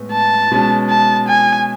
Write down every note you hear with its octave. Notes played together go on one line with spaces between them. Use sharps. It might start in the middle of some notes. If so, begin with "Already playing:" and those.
Already playing: A2 G#3 B3
A5
B2 G#3 C#4
A5
G#5